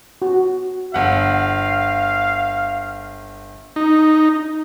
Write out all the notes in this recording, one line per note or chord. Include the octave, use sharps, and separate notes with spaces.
F#4
G1 F5 F#5
D#4